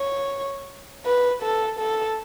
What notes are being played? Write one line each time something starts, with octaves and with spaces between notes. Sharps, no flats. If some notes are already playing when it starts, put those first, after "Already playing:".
Already playing: C#5
B4
A4
A4